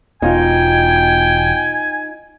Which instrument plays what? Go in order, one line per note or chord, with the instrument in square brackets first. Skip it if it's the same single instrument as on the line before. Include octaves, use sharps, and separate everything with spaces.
[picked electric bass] E1 B2 [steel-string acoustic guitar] D#4 F4 [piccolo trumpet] G5 [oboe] G#5